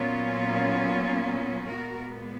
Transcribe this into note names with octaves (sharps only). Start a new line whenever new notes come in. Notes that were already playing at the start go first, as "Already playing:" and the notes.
Already playing: A#2 F#3 B3 C#4 F4
A#2 G#3 B3 F#4 A#4